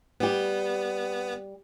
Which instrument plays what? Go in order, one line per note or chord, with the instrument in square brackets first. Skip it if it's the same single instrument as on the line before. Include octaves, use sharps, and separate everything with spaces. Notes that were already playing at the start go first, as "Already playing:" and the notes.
[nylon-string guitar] G3 G4 [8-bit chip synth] B3